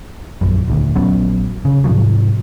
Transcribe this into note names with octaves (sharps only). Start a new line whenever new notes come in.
A#1 F#2
D#1 D2
A#1 F#3 B3 C#4
C#3
G#2 C3 F3 F#3